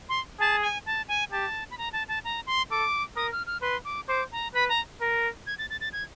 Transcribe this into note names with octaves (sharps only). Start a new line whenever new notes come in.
C6
G#4 A5
G#5
A5
G#5
G4 A5
B5
A#5
A5
A5
A#5
C6
A4 D6
A#4 D#6
F6
F6
B4 C6
D6
C5 D6
A#5
B4 B5
A#5
A#4
G#6
A6
A6
A6
G#6